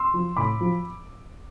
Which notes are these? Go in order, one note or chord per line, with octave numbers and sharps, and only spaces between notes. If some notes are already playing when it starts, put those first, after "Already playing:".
Already playing: C6 E6
F3
A2 B5 D6
F3